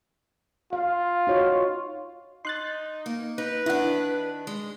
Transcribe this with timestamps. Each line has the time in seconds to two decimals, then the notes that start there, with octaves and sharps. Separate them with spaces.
0.73 F4 F5
1.27 D#4 F#4 C#5
2.45 D#4 C6 F#6 A6
3.06 A#3
3.38 D#4 B4
3.66 D#3 D4 E4 F#5
4.47 G#3